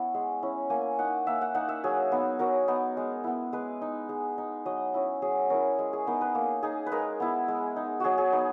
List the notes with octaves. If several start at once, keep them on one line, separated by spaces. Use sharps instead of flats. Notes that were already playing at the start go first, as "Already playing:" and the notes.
Already playing: B3 C#4 E4
G#3
C#4 E4
A#3 G#5
D#4 F#5
A#3 E5
F#5
D#4 F#5
E5
F#3 G#4
B3 D#4
F#3 A#4
B3 D#4
G#3
B3 E4
G#3 B4
D#4
G#3
D#4
F#3 D#5
C#4 E4
F#3 G#4
C#4 E4 A#4
G#3
G#4
B3 D#4 A#4
B4
A#3
D#4 G#4
B4
G#3 A#4
B3 E4
G#3
D#4
F#3 F#4 G#4
G#4
B3 D#4 G#4